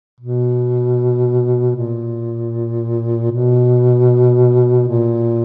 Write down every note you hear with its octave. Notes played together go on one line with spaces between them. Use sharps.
B2
A#2
B2
A#2